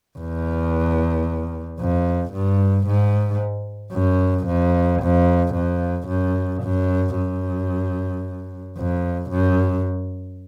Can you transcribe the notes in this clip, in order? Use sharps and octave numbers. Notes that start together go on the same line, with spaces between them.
E2
F2
G2
G#2
F#2
F2
F2
F2
F#2
F#2
F#2
F2
F#2